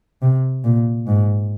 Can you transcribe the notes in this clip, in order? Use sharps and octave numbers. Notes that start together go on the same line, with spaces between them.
C3
A#2
G#2